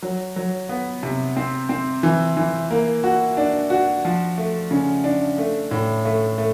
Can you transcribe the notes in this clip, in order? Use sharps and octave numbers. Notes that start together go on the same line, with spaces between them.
F#3
F#3
B3
C3
C4
C4
E3
E3
A#3
F#4
D4
F#4
F3
A3
C#3
D4
A3
A2
A3
A3